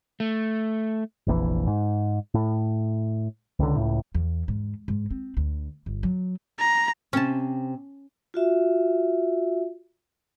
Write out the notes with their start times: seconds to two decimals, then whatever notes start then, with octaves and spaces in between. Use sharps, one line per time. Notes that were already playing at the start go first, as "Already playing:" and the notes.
0.20 A3
1.27 F1 A#1 A#2 E3
1.67 G#2
2.34 A2
3.59 C#2 D3
3.76 C#2 A2
4.15 E2
4.48 G#2
4.88 G#2
5.11 C4
5.37 D2
5.86 G1
6.03 F#3
6.59 A#5
7.13 C3 C4 C#4 A5
8.34 F4 F#4 E5